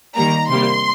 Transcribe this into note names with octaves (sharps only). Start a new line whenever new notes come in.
D#3 G3 A#3 A#5
C3 G3 A#3 C6